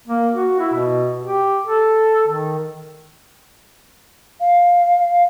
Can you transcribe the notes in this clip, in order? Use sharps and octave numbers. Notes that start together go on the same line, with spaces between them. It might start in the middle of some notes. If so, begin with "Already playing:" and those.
A#3
F#4
E4
B2
G4
A4
D#3
F5